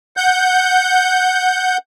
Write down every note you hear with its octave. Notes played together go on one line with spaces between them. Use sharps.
F#5 G6